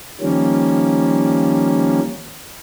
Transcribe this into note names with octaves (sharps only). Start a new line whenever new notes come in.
D#3 F3 G3 A#3 C#4